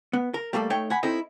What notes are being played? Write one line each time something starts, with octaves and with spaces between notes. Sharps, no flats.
B3
A#4
G3 A3 A#3 A4 D5
A3 D#4 C#5 G5
F#5 G#5 B5
C4 D#4 E4 A4 C5 D#5